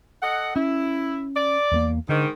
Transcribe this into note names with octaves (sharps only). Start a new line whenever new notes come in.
A4 D#5 F#5
C#4 E4
D5
E2 A3 A#3
G#2 D3 D#3